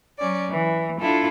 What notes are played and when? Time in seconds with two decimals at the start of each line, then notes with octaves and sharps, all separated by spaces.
0.19 F#3 C#4 D5
0.52 E3
1.00 D4 E4 F4 A4